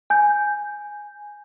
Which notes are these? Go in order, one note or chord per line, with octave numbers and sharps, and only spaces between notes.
G#5 G6